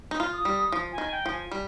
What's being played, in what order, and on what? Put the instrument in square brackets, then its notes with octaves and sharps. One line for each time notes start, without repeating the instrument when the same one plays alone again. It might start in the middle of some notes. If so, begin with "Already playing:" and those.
[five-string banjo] D#4
F4
[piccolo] D#6
[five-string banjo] G3
F3
[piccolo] G#5
[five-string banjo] D#3
[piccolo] G5
[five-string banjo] F3
[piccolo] G#5
[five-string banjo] G3